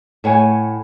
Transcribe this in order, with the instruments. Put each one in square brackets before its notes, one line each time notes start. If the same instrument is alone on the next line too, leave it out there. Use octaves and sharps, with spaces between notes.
[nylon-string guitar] A2 C#5 F#5 G#5